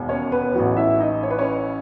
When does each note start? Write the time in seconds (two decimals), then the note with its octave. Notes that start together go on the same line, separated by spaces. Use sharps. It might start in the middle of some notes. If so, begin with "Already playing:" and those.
Already playing: E1 D#2
0.09 C#4 C#5
0.32 B3 B4
0.54 A1 A2 E3 F#3 F#4
0.77 E4 E5
1.00 D#4 D#5
1.23 C#5
1.30 B4
1.38 C#4 C#5